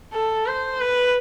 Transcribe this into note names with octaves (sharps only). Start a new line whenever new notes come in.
A4
C5
B4